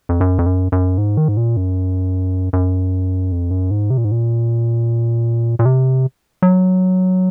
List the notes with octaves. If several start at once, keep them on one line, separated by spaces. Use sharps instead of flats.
F2
F#2
F2
F#2
F#2
G#2
D#3
G#2
A#2
F#2
F#2
F2
F#2
G#2
C3
A#2
G#2
A#2
A#2
C3
F#3